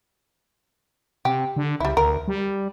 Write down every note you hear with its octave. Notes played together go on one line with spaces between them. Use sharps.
C3 G4
D3
C#2 G3 E4
D2 A#4
G3